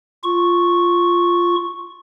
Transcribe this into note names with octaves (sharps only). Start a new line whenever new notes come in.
F4 C#6